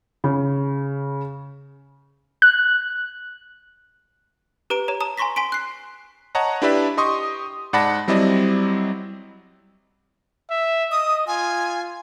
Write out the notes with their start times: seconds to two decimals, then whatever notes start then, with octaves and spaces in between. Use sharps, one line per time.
0.24 C#3
2.42 F#6
4.70 G4 B4 A#5 D7
4.88 G4 C#5 A#5
5.00 A5 A#5 D#6 E7
5.18 G#5 A#5 C6 C#6 A#6 B6
5.36 G#5 C6 B6 D7
5.52 F#6 C7
6.35 C#5 D#5 F#5 A5 A#5
6.62 D4 E4 G4 B4 D5 E5
6.97 G4 D#5 C6 C#6 D#6
7.73 G#2 D5 F#5 A5 B5 A#6
8.08 F#3 G3 C4 E4 D5 D#5
10.50 E5
10.92 D#5 D#6
11.27 F4 G#5